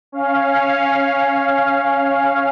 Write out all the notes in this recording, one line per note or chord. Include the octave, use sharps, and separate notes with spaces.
C#4 F5